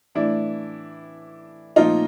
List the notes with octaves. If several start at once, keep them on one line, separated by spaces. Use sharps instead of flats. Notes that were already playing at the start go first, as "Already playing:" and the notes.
A2 E3 A3 D4 E4
A#2 F3 A3 D#4 F4